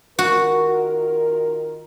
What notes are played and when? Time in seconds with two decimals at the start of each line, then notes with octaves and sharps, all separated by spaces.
0.19 D#3 F4 F#4 A#4